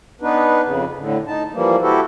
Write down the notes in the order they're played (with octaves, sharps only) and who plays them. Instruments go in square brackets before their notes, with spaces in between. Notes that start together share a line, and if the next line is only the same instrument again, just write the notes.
[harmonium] B3 D4 D#4 B4
F2 C#3
A2 D3
D#4 A5
E3 F3 G3 A#3
E4 F#4 G4 A4